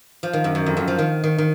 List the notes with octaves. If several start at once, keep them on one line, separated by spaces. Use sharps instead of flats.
F3
D#3
F#2
F#2
F2
F#2
F3
D#3
D#3
D#3